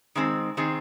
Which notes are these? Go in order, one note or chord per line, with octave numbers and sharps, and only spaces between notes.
D#3 G#3 C4
D#3 C4 G#4